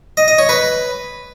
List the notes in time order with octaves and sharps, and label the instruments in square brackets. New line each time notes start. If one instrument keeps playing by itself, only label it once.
[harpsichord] D#5
D#5
C#5
B4